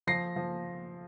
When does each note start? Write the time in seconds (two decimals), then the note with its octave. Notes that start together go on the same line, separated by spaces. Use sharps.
0.07 F3 A#6 C7
0.36 F3